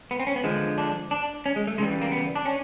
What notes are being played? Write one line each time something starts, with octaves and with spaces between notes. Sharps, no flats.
B3
C4
C#4
B3
D3 F3 G#3
D4
D4
C#4
G#3
A3
C#3 E3 G3 G#3
A#3
B3
D4
C#4